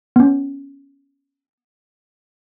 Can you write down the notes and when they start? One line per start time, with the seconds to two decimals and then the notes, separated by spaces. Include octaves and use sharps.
0.16 B3 C#4